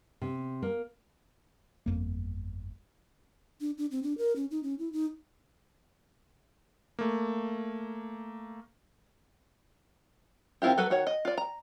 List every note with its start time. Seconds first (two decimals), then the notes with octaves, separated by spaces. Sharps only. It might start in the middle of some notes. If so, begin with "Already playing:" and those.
0.21 C3
0.62 A#3
1.86 G1 F2 A#3
3.61 D4
3.78 D4
3.91 C4
4.03 D4
4.18 A#4
4.36 C#4
4.51 D#4
4.63 C#4
4.79 E4
4.93 D#4
6.99 A3 A#3
10.62 D#3 C4 E4 F4 G4
10.78 F#3 F#4 A4 B4
10.90 D#3 F#4 C#5 F#5
11.07 D#5
11.25 F4 D5
11.38 A#5